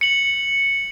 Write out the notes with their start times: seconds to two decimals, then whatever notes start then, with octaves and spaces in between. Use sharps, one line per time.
0.01 C#7 F#7